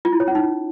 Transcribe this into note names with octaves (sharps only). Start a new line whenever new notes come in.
F4
E4
C#5
C#4
D#4